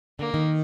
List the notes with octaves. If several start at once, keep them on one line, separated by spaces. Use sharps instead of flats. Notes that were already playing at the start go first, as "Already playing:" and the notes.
D3 A#3
D#3